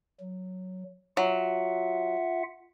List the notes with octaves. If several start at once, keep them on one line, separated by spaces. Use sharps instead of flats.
F#3
F#3 F4 E5 F#5